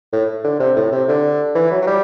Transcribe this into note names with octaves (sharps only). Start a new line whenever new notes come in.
A2
D3
C3
A2
C3
D3
E3
F#3
F#3
G3